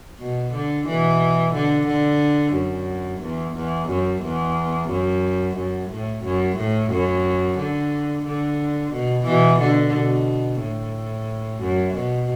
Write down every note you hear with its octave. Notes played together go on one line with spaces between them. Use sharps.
B2
D3
B2 E3
D3
D3
F#2
E2
E2
F#2
E2
F#2
F#2
A2
F#2
A2
F#2
D3
D3
B2
B2 E3
D3
B2
A2
F#2
B2